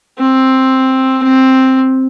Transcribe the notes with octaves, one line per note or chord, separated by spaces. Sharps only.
C4
C4